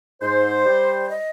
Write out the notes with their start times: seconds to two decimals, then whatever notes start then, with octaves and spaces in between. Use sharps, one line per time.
0.22 G#2 C5
0.65 G3
1.08 D#5